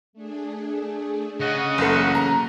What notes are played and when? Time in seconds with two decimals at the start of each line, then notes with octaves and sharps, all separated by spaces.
0.13 A3 D4 G#4
1.40 C#3 D#5 F#5
1.78 F#1 E3 F#3 A3 A#3
2.15 A#3 A#5